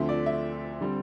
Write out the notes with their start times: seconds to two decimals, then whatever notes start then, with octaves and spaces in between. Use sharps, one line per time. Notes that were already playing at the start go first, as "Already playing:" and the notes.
Already playing: D2 D3 F3 A3 C4 E5
0.09 D5
0.26 E5
0.81 D3 G3 C4